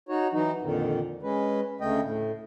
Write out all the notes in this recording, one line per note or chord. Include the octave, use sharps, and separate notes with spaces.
D#4 F#4 C#5
E3 F#3 D#4
F2 A#2 D3 D#3
G#3 C#4 B4
D2 C#3 A3 D#5 G5
A2